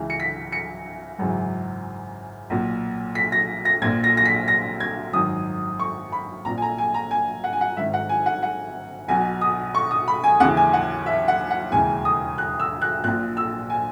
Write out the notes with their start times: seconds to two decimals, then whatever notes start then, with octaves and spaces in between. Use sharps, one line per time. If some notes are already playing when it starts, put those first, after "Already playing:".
Already playing: C#2 C#3 E3
0.10 C#7
0.20 B6
0.52 C#7
1.19 G#1 F#2 C#3 E3
2.50 B1 A#2
3.15 B6
3.32 A#6
3.65 A#6
3.82 A#1 G#6
3.84 A#2
4.04 A#6
4.17 A#6
4.26 B6
4.48 A#6
4.80 G#6
5.13 G#1 F#2 D#3 D#6
5.79 C#6
6.12 B5
6.45 A#1 A#2 A#5
6.58 G#5
6.62 A#5
6.78 G#5
6.94 A#5
7.11 G#5
7.44 F#5
7.53 G#5
7.61 F#5
7.77 G#1 G#2 D#3 E5
7.94 F#5
8.09 G#5
8.26 F#5
8.43 F#5
9.08 B1 B2 G#5
9.41 D#6
9.75 C#6
9.91 D#6
10.08 B5
10.24 G#5
10.40 D#2 C#3 E3 F#5
10.57 G#5
10.73 F#5
11.06 E5
11.28 F#5
11.51 F#5
11.72 E1 D#2 C#3 E3 G#5
12.05 D#6
12.38 F#6
12.60 E6
12.82 F#6
13.04 A#1 A#2 F#6
13.37 E6
13.70 G#5